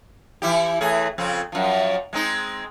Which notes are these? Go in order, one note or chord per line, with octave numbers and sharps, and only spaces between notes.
E3 E4 G4
A2 E3 G#4
F2 C#3 C4
F#2 F3
G#3 C4 D#4